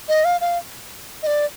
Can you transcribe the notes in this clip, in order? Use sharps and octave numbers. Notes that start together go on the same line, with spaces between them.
D#5
F5
F5
D#5
D5